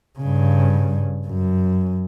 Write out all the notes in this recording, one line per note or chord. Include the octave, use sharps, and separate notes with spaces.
G2 C#3
F#2